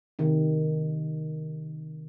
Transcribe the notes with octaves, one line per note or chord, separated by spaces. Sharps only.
C3 D#3